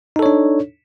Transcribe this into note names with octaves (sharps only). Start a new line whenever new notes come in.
D4 D#4 A4 C#5